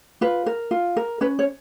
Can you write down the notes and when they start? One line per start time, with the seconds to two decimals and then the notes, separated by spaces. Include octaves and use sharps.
0.21 F4 B4
0.46 A#4
0.71 F4
0.97 A#4
1.21 C#4 B4
1.39 C#5